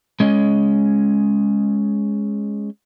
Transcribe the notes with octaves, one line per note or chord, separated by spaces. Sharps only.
G#3 C#4 D#5